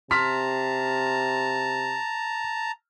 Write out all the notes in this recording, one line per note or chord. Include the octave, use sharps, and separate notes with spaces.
C3 A5 A#5 C6 F6 B6